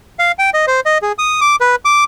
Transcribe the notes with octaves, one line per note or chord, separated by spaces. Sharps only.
F5
G5
D#5
C5
D#5
G#4
D#6
D6
B4
D6